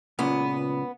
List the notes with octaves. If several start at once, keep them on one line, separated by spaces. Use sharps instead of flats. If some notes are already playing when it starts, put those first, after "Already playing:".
C#2 A#2 C#3 B3